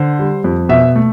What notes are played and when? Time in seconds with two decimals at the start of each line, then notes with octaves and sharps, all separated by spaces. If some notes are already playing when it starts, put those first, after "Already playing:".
Already playing: D3 C5
0.19 G3
0.44 F2
0.69 B2 E5
0.96 A3